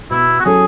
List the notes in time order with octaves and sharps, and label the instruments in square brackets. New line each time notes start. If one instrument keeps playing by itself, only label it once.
[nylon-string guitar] B2 [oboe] E4
[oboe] F#4
[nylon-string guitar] F#3 C#4 E4 A4 [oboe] G#4